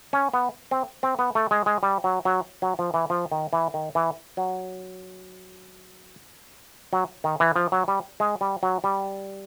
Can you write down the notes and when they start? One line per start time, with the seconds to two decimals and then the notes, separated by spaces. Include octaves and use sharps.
0.13 C#4
0.34 B3
0.71 C4
1.03 C4
1.19 B3
1.35 A3
1.51 G#3
1.66 G#3
1.83 G3
2.04 F#3
2.25 F#3
2.62 F#3
2.79 F3
2.94 E3
3.10 F3
3.32 D#3
3.53 E3
3.74 D#3
3.95 E3
4.37 F#3
6.93 F#3
7.24 D#3
7.40 E3
7.56 F3
7.72 F#3
7.88 G3
8.20 G#3
8.41 G3
8.63 F#3
8.84 G3